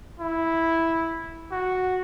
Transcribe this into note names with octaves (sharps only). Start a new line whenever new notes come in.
E4
F#4